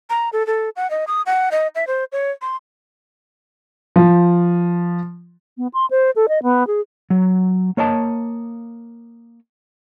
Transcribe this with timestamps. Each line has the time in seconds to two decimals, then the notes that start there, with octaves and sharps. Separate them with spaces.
0.10 A#5
0.33 A4
0.47 A4
0.76 F#5
0.91 D#5
1.07 D#6
1.26 F#5
1.52 D#5
1.75 E5
1.87 C5
2.12 C#5
2.42 C6
3.96 F3
5.57 B3
5.74 C6
5.91 C5
6.16 A4
6.29 D#5
6.43 B3
6.67 G#4
7.10 F#3
7.77 A#3 C#5 D#5 A5